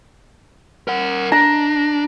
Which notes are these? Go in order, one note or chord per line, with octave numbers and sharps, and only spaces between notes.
A#4 F#5
D4 A#5